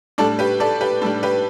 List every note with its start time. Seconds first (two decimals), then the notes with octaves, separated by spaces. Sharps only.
0.18 A2 G3 D4 A4 D5
0.39 G4 B4
0.60 A4 D5
0.81 G4 B4
1.02 A2 A4
1.04 G3 D4
1.23 G4 B4